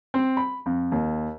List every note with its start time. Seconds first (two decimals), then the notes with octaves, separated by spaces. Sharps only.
0.14 C4
0.37 B5
0.66 F2
0.92 D#2